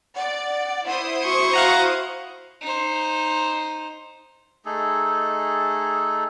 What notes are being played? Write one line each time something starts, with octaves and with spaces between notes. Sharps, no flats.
D5 F#5
E4 C5 F#5 D#6
F#4 C#6
F5 F#5 A#5
D#4 C5
A3 D#4 G#4 A4